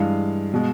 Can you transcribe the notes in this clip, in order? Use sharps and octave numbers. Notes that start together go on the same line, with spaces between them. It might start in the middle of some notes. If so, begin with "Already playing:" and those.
Already playing: G2 E3 G#3 F5
B2 G#3